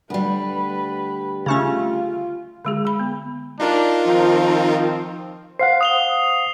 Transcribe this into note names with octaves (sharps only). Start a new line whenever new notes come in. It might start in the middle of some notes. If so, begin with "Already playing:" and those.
D2 G3 B4
C#3 A3 C#4 F4
D3 G#3 G#4
G#3 B5
B3
D4 D#4 F4 A#4
D#3 F3 C4
C5 F5 F#5 C7
D#6 F7 G7